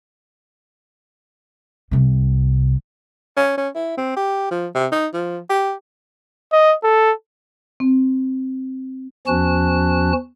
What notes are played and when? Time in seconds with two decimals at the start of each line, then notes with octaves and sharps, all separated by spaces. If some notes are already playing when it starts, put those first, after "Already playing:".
1.91 C2 C3
3.37 C#4
3.58 C#4
3.75 E4
3.98 C4
4.16 G4
4.51 F3
4.75 C3
4.92 D#4
5.14 F3
5.50 G4
6.52 D#5
6.83 A4
7.80 C4
9.27 E2 F3 C#4 F#4 A5 F#6